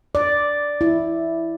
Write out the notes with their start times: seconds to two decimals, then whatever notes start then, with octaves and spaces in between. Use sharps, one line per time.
0.15 D5
0.81 E4